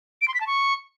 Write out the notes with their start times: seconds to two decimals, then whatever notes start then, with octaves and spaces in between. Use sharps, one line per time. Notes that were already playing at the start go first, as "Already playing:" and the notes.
0.22 D7
0.28 C6
0.34 B6
0.40 A5
0.47 C#6